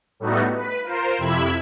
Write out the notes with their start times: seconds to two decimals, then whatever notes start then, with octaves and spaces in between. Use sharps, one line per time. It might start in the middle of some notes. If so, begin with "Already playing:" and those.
0.20 A2 G3 A3 B3 D#4 F#4
0.55 B4
0.84 F4 A#4 C5
1.18 F2 C3 E4 B5 G#6 E7